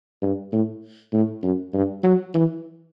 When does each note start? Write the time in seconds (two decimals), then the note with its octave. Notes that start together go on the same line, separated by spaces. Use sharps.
0.22 G2
0.52 A2
1.13 A2
1.43 F#2
1.74 G2
2.03 F#3
2.34 E3